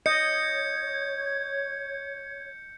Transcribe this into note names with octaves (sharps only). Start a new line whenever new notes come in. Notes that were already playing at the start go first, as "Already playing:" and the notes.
C#5 D#5 G6 G#6 C#7